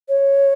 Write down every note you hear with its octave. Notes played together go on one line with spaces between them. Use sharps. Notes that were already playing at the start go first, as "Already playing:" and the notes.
C#5